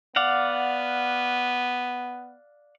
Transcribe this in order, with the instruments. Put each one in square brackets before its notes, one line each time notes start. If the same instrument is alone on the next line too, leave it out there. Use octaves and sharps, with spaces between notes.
[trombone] B3 [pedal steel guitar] D5 F5 F#5